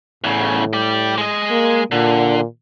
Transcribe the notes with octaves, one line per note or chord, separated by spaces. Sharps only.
E2 A2 C#3
G4 D5
G#3 D#5
A#3
A#2 D3